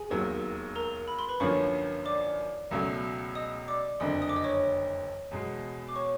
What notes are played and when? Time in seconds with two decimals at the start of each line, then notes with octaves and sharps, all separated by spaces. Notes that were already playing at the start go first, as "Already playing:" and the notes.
Already playing: G#4 G#5
0.10 E1 D#2 D#3 F#3 A#3
0.75 A#4 A#5
1.08 B5
1.19 C6
1.29 B4 B5
1.40 G#1 F#2 D3 F3 A#3 C#5 C#6
2.06 D5 D6
2.71 C#2 B2 F#3 A3 C#4
3.35 D#5 D#6
3.68 D5 D6
4.00 F#1 F2 D3 D#5 D#6
4.22 D#6
4.29 D6
4.36 D#5 D#6
4.44 C#5 C#6
5.31 E2 B2 G#3
5.89 D6
5.96 C#5 C#6